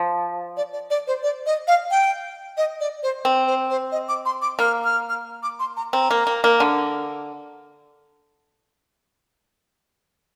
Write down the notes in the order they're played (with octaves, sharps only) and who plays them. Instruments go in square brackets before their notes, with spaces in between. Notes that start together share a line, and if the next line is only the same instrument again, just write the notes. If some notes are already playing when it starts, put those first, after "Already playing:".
Already playing: [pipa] F3
[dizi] D5
D5
D5
C5
D5
D#5
F5
G5
D#5
D5
C5
[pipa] C4
[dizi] C5
C5
D#5
D6
C6
D6
[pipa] A#3 [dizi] F6
[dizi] F6
F6
D6
C6
A#5
[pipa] C4 [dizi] A#5
[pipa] A#3
A#3
A#3
D3